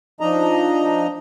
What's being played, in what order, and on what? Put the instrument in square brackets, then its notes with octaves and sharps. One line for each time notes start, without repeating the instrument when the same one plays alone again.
[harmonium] F3 D4 D#4 D#5 A#5